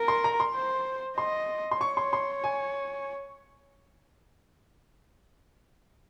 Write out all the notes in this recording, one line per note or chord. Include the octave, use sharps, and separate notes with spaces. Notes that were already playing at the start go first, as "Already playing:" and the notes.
Already playing: A#4
C6
A#5
C6
C5
D#5 C6
C6
C#5 C#6
C6
C6
G#5